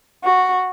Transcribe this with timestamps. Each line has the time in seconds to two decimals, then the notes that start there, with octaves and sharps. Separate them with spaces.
0.25 F#4